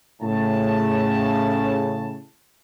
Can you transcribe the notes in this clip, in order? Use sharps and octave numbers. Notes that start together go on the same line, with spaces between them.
A2 C#3 A5